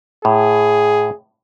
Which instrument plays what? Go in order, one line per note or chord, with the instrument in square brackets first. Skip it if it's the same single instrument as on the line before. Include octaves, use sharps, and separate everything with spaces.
[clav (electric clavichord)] A2 [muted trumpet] G#4